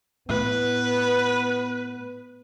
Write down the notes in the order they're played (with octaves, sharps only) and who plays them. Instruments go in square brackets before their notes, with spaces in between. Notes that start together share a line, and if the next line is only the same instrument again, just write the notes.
[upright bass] A2 [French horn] B3 [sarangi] B4